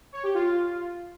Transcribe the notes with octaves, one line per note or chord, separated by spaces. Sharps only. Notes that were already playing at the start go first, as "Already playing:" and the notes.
C#5
G4
F4